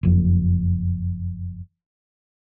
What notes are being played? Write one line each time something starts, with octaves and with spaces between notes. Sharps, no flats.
F#1 F2